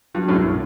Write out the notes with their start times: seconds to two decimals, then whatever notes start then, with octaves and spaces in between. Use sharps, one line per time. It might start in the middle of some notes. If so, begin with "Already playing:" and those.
0.14 G2 F#3
0.28 F#2 A2
0.36 C2